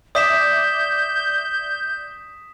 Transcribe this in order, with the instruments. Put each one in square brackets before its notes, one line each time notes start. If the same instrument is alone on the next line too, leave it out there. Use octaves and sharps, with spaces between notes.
[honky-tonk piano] D5 E5 [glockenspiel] D#6 B6 E7 [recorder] G6